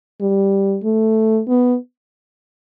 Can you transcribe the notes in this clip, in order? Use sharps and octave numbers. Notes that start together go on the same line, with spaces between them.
G3
A3
B3